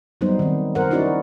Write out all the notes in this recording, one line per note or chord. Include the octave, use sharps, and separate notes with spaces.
F#3 G3 B3 D#4 C5
D#3 C4
A#4 C5 F#5
C#4 D#4 E4 F#4 A#4 D5